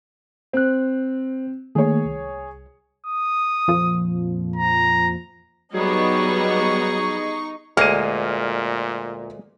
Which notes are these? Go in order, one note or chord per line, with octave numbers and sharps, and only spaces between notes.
C4 C5 F#6
D#3 A3 A#3 G#4 C#5
C2
D#6
F2 A#2 F3
A#5
F#3 G3 B3 D#4 G#4 C#6
D2 A#2 G#3 A#3 F6 D#7